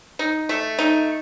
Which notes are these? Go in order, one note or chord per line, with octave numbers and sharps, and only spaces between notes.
D#4
A3
D#4